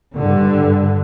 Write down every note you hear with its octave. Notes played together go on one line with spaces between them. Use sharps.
G2 D3